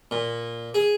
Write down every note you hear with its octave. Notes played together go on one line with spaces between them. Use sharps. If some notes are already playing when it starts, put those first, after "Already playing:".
A#2
G#4